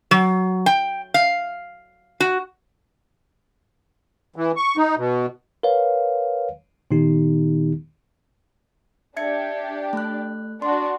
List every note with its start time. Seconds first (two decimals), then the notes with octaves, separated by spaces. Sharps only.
0.11 F#3
0.66 G5
1.14 F5
2.20 F#4
4.36 E3
4.57 C#6
4.77 D#4
4.97 B2
5.63 A#4 B4 C#5 F5
6.91 A#2 D#3 B3 D#4 G4
9.17 D4 G4 E5 G#6 C#7
9.93 A3 F#6
10.62 D4 F#4 C6